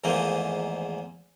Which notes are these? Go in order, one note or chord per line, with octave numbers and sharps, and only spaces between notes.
E2 G#2 D#3 F3 A3 A#3